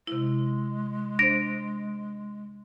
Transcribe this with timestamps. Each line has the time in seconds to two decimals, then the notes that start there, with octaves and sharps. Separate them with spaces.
0.07 C3 G#3 E4
1.19 D4 C5 A#6 D7